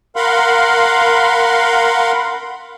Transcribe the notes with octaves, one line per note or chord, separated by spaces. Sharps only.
A#4 F5 F#5 B5 C6